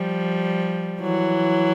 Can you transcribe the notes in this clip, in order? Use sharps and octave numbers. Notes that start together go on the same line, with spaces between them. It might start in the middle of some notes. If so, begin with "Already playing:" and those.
Already playing: F3 G3
E3 F#3